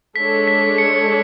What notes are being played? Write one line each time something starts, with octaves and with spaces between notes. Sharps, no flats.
G#3 D4 A4 C#5 B6
B6
C#7